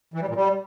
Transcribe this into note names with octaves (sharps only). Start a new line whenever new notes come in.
E3
G3
A#2
G3